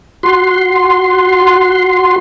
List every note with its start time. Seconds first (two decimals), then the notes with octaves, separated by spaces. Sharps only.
0.23 F#4 C6